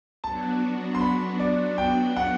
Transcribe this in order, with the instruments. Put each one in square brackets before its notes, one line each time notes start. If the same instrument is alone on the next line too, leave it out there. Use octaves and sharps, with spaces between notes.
[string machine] F#3 B3 D4 F#4 [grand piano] A5
[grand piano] C6
B5
D5
G5
F#5